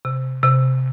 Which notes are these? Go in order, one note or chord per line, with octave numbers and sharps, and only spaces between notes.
C3
C3